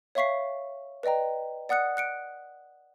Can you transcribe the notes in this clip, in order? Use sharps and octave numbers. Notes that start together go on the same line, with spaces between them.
C#5 E5 F5 C#6 B6 C7
B4 D5 D#5 G5 A#5
D5 F#5 D#6 F#6 C#7
F#6 C#7 D7